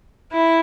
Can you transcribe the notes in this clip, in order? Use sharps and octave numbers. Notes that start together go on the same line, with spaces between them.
E4